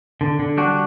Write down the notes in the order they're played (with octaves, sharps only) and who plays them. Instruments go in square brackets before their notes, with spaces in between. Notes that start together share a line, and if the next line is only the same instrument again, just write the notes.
[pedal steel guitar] D3
D3
G3 D4 F#4